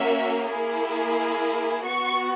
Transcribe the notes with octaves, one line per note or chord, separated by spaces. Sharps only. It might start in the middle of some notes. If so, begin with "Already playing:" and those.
Already playing: A#3 C#4 F#4 E5
A#3 E4 G#4
B3 F#4 C#6